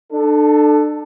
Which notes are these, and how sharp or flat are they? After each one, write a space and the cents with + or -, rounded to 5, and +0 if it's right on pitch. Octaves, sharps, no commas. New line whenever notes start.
D4 +35 A4 +0